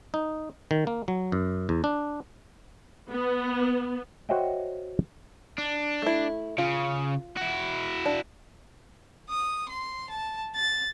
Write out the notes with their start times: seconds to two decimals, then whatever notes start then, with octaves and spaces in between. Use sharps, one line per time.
0.14 D#4
0.71 D#3
0.87 A#3
1.08 F#3
1.32 F#2
1.69 E2
1.84 D4
3.10 B3
4.29 F#4 C5 C#5 D#5 E5 G5
5.58 D4
6.02 A3 E4
6.58 C#3 F4
7.37 E4 F#4
8.06 D4
9.30 D#6
9.69 C6
10.10 A5
10.56 A6